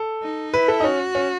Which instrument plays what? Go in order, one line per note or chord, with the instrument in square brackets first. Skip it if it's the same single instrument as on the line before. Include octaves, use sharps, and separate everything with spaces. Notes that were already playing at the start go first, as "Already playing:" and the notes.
Already playing: [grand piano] A4
[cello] D#4
[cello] E4 [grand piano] B4
[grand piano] A4
D#4
[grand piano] C#4 [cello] F#4
[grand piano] C#4